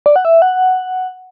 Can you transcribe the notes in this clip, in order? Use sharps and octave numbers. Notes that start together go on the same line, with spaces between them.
D5
F#5
E5
F#5